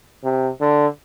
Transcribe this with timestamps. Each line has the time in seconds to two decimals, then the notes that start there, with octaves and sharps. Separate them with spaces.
0.24 C3
0.61 D3